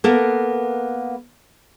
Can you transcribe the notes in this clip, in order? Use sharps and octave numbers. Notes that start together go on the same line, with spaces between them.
A#3 B3 A4 A#4